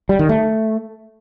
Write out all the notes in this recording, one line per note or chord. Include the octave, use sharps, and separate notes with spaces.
G3
D#3
A3